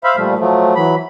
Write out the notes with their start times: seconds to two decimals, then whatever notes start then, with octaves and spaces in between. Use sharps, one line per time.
0.04 C5 E5 F5 B5
0.17 A#2 F3 G3 A3
0.39 F3 F#3 A3
0.75 E3 F#3 B5